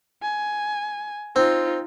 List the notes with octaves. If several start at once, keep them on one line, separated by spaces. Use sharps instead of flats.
G#5
C4 D#4 F4